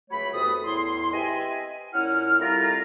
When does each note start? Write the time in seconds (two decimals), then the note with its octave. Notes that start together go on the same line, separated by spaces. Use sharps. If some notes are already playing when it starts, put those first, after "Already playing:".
0.11 C#2 F#3 A3 C#5 B5
0.34 E2 C3 F#4 A4 B4 D#6
0.65 E2 A2 E4 C6
1.14 C4 G4 B4 D#5 E5 G#5
1.94 A#2 C#4 E4 F#5 F6
2.40 G3 A3 C4 E4 F4 A#4